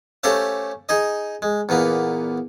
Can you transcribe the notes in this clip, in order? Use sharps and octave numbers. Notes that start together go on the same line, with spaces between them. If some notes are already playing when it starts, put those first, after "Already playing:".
A3 C#4 G4 A4 C5 F5
D#4 G#4 D#5
G#3
E2 A#2 A#3 B3